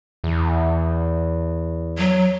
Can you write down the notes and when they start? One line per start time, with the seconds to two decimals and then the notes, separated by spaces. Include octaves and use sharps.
0.24 E2
1.98 F#3